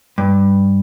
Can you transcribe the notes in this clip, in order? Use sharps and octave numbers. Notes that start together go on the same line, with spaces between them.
G2